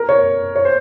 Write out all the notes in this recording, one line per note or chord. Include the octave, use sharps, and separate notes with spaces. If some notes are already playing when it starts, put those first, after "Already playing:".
Already playing: A#4
C#5
C#5
C5